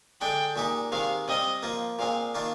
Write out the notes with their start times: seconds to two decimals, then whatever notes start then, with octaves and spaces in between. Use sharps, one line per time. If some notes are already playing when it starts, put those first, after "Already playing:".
0.21 D3 G#3 D4 G5
0.56 A#2 G#3 D#4 G4
0.92 C3 D#3 G#3 F5
1.28 C3 G3 C4 D#5
1.63 F3 A#3 F4
1.99 A#2 G#3 C4 F5
2.35 D#3 A#3 D4 F4